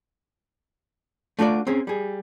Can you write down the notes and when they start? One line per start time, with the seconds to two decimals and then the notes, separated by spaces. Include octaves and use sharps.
1.39 A3 D4 F4 F#4 C#5 D5
1.67 C4 C#4 G#4
1.87 G3 G#4